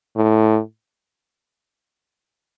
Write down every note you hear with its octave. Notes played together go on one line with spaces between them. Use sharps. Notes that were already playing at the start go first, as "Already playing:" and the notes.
A2